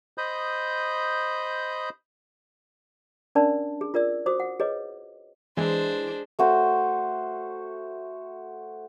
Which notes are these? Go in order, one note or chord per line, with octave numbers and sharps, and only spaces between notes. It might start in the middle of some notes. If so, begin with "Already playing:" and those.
C5 D#5 B5 D#6 G6
C#4 D4 A#4 D5 A5 B5
G#4
F4 A#4 D5 E6
F#4 C5 D6 D#6
F#5
G#4 B4 C#5 D#5
E3 G#3 D4 C5
A3 F#4 C5